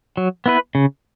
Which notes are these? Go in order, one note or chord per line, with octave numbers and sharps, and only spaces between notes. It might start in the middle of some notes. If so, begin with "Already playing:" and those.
F#3
B3 E4 B4
C#3